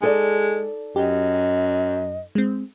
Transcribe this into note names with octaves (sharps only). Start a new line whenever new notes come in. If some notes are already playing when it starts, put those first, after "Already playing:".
G#3 D#4 A4 D5
F#2 G4 D#5
G#3 C4